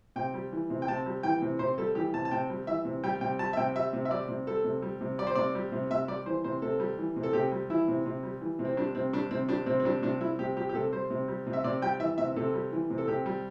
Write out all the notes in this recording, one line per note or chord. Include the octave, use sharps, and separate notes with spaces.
C3 G5
G3
E3
C3
G5
C3 A5
G3
E3 G5
C3
C3 C5
G3 A4
E3 G4
C3 A5
A5
C3 G5
G3
E3 E5
C3
G3 G5
C3 G5
G3 A5
E5
C3 G5
G3 E5
C3
E5
G3 D5
C3
G3 A4
C3
G3
C3
G3 D5
C5
C3 D5
G3
C3
C3 E5
G3 D5
E3 C5
C3 C5
C3 A4
G3
E3
C3
A4
C3 G4
G3
E3 E4
C3
C3
G3
E3
C3
C4
G3 D4
C3 C4
G3 D4
C3 C4
G3 D4
C3 C4
C4
G3 D4
C3 D4
G3 E4
C3 G4
G3 G4
G4
C3 A4
G3 C5
C3
G3
C3
E5
C3 D5
G3 G5
E3 E5
C3 E5
C3 A4
G3
E3
C3
A4
C3 G4
G3